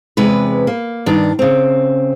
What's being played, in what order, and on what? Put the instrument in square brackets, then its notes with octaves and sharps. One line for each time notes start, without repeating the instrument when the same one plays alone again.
[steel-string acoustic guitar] E2 C3 G#3 B4
A#3
G2 D#3 D4
C#3 C4